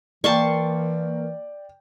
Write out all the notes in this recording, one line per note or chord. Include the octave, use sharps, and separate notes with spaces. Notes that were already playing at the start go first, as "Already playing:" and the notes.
E3 A#3 A#4 D5 G5 A5 C6 C#6